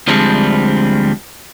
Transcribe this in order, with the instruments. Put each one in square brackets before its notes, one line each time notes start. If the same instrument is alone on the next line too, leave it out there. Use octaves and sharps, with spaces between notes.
[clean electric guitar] D2 F3 G3 G#3 C4 D4